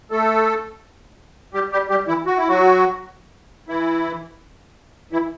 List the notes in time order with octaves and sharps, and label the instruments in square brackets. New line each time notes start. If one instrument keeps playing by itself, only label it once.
[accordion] A3 A4
G3 G4
G3 G4
G3 G4
E3 E4
F#4
E4
F#3 F#4
E3 E4
E3 E4